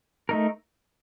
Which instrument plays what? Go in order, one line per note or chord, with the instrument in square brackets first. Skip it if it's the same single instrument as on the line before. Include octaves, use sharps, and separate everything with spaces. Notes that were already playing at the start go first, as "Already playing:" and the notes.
[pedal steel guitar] A3 D#4 A#4